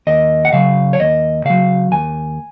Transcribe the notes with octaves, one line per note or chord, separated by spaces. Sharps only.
D#2 D#5
F#5
C#3 F#3 F5
C#5
D#2 D#5
C#3 F#3 F5
D#2 G#5